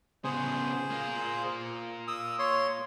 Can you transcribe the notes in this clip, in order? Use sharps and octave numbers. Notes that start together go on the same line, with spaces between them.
C#3 B3 G#4 C5
A#3 F4
D#6 E6
C#5 C6